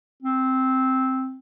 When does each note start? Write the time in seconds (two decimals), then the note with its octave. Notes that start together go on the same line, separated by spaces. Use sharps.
0.22 C4